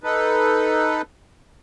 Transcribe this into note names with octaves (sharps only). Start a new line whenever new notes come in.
D#4 A4 B4